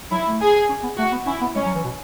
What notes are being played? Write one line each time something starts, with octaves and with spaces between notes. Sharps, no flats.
F#3 E4
A3
G#4
C#4
B3
A3 F#4
B3
C#4 E4
B3
G#3 C#4
F#3
E3
B2